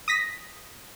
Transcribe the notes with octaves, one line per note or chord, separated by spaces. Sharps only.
D#6 A#6 B6